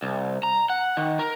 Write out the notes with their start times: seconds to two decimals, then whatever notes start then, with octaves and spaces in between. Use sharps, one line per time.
0.03 C2
0.43 A#5
0.70 F#5
0.97 D#3
1.19 A#4